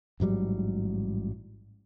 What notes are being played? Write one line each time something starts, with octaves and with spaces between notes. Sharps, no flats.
A1 G#2 F#3 G3